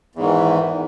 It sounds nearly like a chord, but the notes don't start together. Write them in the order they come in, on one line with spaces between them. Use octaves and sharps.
E2 G#2 D#3 E3